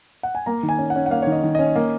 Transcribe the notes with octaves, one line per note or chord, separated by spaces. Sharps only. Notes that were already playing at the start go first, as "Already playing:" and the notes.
F#5
G#5
A#3 A#5
D#3
G#5
C#4
F#5
C#4
F#5
A#3 F5
D#3 C#5
D#5
D#3
C#4 D#5
A#3